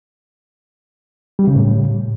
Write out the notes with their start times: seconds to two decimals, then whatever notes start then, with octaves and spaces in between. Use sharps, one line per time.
1.39 G3
1.47 C#3
1.56 A2